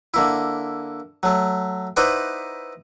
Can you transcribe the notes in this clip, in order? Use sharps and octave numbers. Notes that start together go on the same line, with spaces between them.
D3 A#3 E4
F#3 A3
D#4 E4 B4 C5 D5 F#5